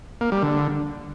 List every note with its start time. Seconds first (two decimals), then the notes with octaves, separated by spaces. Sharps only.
0.21 A#3
0.32 G3
0.43 D3